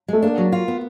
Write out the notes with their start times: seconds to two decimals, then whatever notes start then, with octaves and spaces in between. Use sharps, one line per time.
0.08 G#3 A3
0.22 A#3 D4
0.38 F#3
0.52 F4
0.68 B3